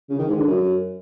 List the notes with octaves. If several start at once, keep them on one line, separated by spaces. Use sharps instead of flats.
C#3
D#3
G#2
D3
F#2